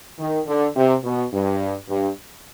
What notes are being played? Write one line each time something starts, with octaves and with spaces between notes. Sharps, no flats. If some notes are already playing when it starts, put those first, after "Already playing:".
D#3
D3
C3
B2
G2
G2